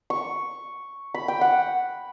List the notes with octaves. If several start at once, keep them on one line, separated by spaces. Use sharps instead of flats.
C#6
B5
G5
F#5